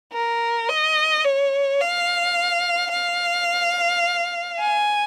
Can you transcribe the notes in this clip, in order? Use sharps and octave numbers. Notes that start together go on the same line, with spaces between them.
A#4
D#5
C#5
F5
F5
G#5